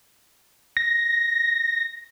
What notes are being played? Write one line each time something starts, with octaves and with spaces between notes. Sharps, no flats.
A#6